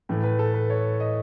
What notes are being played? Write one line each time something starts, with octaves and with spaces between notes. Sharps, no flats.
A2 E3 A3
B4
A4
B4
C#5
D#5